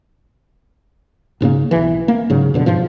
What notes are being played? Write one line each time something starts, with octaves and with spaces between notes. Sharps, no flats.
B1 G#2 C#3 A#3
B1 E3
A#3
G#2 C#3 F#3
F2 B2 D3
G1 G#2 B2 F3